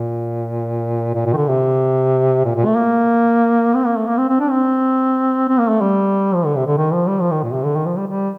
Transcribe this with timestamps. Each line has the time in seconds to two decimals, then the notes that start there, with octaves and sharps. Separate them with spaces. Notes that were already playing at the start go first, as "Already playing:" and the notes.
Already playing: A#2
1.15 A#2
1.26 A#2
1.33 D#3
1.36 D3
1.48 C3
2.45 A#2
2.56 A#2
2.66 A3
2.77 A#3
3.74 C4
3.85 A#3
3.97 A3
4.08 A#3
4.18 C4
4.29 C4
4.40 D4
4.50 C4
5.48 C4
5.59 A#3
5.69 A3
5.81 G3
6.35 F3
6.46 D3
6.56 C3
6.66 D3
6.77 D#3
6.93 F3
7.07 G3
7.21 F3
7.31 D#3
7.43 A#2
7.53 C3
7.64 D3
7.76 D#3
7.86 F3
7.96 G3
8.07 G3